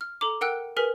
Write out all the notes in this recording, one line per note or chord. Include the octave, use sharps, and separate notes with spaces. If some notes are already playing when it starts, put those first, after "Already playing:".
F6
A4 A#5 D6
A#4 F#5 G5 E6 F#6
G#4 A#4 B4 G#5 F6 B6